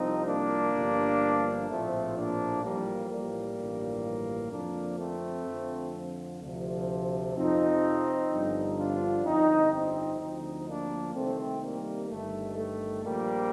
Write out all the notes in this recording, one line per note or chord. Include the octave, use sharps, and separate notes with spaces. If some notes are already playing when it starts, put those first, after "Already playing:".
Already playing: C2 C3 F3 C4 D#4
A#3 D4
G1 G2 F3
A#1 A2 F3 A3 C4
A#3 D4
A1 A2 F3 G3 A#3
G3 A#3
A1 G2 D3 F3
F2 D3 F3 A#3 D4
A3 C4
F2 D3 F3
D2 C3 F3
F2 C3 F3 C4 D#4
G1 G2 D3 F3
D4 F4
G1 F2 D3 F3 C4 D#4
C4 D#4
D2 D3 F3 C4 D#4
A#3 D4
C2 C3 D#3 A3 C4
G3 A#3
G1 G2 D#3 A3
A3
A#1 A#2 F3 G3 A#3